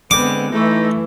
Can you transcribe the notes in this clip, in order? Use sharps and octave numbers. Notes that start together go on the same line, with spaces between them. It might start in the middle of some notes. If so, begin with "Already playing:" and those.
D3 G#3 B3 C4 D6
E3 A3 D#4